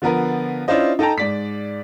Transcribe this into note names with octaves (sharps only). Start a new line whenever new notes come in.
D3 F3 B3 A#4 B4
C#4 D4 E4 F4 C5 D#5
D#4 A4 D#5 G5 A5 A#5
G#2 D5 B6